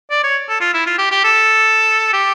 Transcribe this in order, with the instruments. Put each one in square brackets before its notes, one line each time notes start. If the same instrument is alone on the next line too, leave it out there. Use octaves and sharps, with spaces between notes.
[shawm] D5
C#5
A4
F4
E4
F4
G4
G4
A4
G4